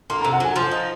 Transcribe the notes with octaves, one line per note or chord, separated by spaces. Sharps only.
A#3 C6
A#5
C3
F#5
F#3 G#5
F3 C6
D#4